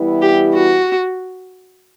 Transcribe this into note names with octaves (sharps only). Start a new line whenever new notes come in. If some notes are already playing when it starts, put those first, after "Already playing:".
Already playing: E3 G3 B3 E4
G4
F#4